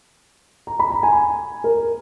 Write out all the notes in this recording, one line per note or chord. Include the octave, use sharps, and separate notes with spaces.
A#5
B5
A#5
G#5
A#4